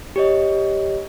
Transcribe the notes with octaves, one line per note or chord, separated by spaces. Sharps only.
G4 C#5 D#5